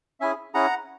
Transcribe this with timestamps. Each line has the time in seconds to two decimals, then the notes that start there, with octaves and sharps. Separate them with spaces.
0.20 C#4 E4 G#4 E5 G#5
0.54 C#4 E4 G#4 F#5 A#5